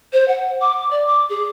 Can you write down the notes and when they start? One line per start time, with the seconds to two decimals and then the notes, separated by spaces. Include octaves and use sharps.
0.13 C5
0.28 F#5
0.61 D6
0.91 D5
1.07 D6
1.30 G#4